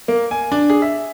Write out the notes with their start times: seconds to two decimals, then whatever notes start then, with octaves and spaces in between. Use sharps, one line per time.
0.08 A#3
0.31 G#5
0.52 D4
0.70 G#4
0.82 E5